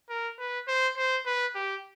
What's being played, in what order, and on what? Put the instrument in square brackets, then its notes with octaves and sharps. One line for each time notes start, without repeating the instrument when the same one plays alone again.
[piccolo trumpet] A#4
B4
C5
C5
B4
G4